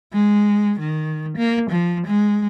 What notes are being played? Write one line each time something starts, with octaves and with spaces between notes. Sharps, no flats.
G#3
D#3
A#3
F3
G#3